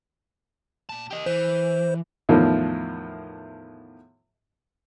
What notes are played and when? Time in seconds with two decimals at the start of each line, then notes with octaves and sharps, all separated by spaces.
0.89 A#2 A5
1.11 G4 D#5
1.26 E3 C5
2.29 E2 A2 D#3 F3